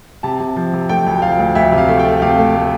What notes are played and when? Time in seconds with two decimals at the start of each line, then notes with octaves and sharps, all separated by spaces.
0.23 C3 A5
0.40 C3
0.56 F3
0.73 C3
0.89 A3 G5
1.06 D2
1.22 F3 F5
1.39 D2
1.55 D2 E5
1.72 C3
1.78 F5
1.89 A3
1.99 G5
2.05 A3
2.22 C3 F5
2.38 A3
2.55 A3